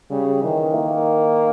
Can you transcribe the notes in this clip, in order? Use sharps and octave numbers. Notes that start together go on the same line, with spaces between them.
C#3 G3
D#3 E3
A#3